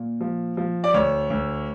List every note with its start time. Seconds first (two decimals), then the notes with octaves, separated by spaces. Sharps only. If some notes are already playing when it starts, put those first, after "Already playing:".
Already playing: A#2
0.20 F3
0.57 F3
0.84 D5
0.94 D2 C#5
1.30 D2